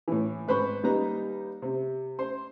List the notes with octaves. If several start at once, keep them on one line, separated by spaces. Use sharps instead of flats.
A2 E3
G#1 B4 C5 B5 C#6
D#2 G3 D#4 B4 A#5
C3
C5 C6